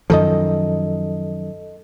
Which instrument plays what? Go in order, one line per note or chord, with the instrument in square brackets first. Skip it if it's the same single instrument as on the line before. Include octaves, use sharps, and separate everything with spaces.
[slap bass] F#2 D#3 F3 [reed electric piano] A4 D#5